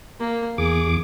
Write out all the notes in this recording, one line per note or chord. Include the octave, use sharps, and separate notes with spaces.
A#3
E2 G#4 D6